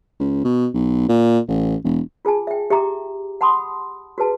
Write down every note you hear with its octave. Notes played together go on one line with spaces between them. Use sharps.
C#2
B2
B1
A#2
A1
E1
F4 G#4 G#5 A5
E5 G5
G4 E5 G5 A#5 D6
F#5 A5 B5 C6 D#6
F#4 G#4 B4 A5